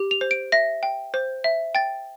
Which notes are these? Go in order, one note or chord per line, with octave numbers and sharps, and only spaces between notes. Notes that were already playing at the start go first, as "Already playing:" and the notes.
Already playing: G4
F7
C5
D7
E5 A#6
G5
C5
E5
G5 A6